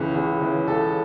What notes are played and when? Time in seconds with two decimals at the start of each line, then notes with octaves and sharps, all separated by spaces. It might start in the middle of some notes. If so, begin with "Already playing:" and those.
Already playing: C#2 C#3 E3 B4
0.15 C#2
0.42 C#3 E3
0.67 C#2 A4